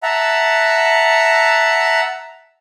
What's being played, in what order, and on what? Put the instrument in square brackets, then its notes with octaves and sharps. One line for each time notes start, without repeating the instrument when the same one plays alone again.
[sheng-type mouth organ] E5 F#5 A5 A#5